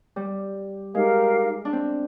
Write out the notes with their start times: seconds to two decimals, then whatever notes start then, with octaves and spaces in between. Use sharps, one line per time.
0.16 G3
0.94 G#3 D#4 G4 A#4 F5
1.65 D4
1.73 C4